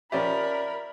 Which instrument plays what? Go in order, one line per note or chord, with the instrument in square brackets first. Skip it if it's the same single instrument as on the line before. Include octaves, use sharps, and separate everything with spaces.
[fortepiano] F3 C#4 G4 [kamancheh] A#4 B5 [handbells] D5 E5